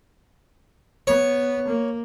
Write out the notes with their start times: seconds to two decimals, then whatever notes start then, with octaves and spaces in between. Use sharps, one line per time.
1.07 B3 C#5
1.67 A#3